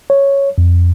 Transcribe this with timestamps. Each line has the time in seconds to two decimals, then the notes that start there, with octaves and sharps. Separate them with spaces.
0.10 C#5
0.58 F2